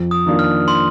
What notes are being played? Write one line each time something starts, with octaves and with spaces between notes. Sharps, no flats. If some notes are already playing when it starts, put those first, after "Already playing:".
Already playing: F2
D#6
D#3 A#3 D4 F4
F6
C6